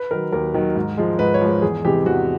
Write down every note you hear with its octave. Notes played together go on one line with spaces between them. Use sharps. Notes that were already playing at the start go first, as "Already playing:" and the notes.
Already playing: B4
D#3 F#3 A#4
D#2 A#4
D#3 F#3
G#2
F3 G#3
G#2 B4
C#5
F3 G#3
E2 G#4
C3 E3 G#3 G4
E2 F#4